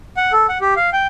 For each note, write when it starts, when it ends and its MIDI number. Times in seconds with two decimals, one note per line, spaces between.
0.17 0.32 78
0.32 0.47 69
0.49 0.58 78
0.61 0.74 67
0.76 0.90 77
0.93 1.07 79